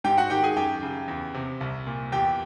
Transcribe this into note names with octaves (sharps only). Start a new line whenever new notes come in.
G#2 G4 G5
F#4 F#5
D#3 G4 G5
G#4 G#5
F#2 G4 G5
C#3
E2
C3
C2
A#2
E2 G4 G5